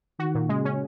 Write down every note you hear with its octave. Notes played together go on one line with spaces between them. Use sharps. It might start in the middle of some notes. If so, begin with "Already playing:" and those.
D#3 F#4
A#2
C#3 G#3
C#4